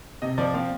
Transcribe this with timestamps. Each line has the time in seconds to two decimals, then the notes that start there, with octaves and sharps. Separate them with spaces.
0.22 C3 D#5
0.38 F3 D5
0.54 C4 F5